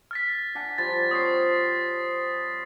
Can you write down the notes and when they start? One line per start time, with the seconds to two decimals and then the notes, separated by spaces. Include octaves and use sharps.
0.11 F6 A6 B6
0.55 D4 F#5 G#5
0.78 F3 G3 F4 A6
1.11 C4 C5 C#5 D#6 C7